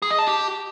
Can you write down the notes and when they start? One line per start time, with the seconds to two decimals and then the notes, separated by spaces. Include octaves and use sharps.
0.02 G#4
0.11 D#5
0.19 A5
0.27 G4